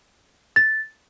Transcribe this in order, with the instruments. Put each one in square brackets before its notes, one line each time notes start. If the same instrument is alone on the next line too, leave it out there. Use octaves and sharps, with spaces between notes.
[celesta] A6